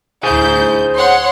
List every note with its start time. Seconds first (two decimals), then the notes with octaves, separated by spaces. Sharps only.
0.23 D2 E4 G#4 C5 G#5 G6
0.96 C#5 F#5 C6